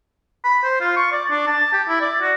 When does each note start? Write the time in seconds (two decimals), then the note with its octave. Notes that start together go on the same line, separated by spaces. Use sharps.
0.45 B5
0.64 C5
0.81 F4
0.97 C#6
1.12 D5
1.31 D4
1.47 A5
1.73 G4
1.88 E4
2.01 D5
2.22 F#4